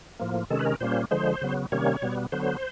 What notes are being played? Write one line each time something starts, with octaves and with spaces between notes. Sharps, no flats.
A2 F3 A#3
C3 D#3 G#3 C#4 A4
B4
A#4
A#2 G3 A#3 C#4 C5
D3 F3 G#3 C5
C#3 F#3 B3
C3 D#3 G3 A#3 C#4 C#5
B2 G3 B3
D3 F#3 B3 C5